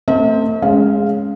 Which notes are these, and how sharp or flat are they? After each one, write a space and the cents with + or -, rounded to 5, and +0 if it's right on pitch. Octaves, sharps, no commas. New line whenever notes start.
A3 +40 C4 +0 E5 -45
G#3 +0 C#4 +0 F5 -5